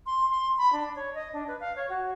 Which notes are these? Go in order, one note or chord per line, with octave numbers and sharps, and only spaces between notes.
C6
C6
B5
D4
C#5
D#5
D4
B4
F5
C#5
F#4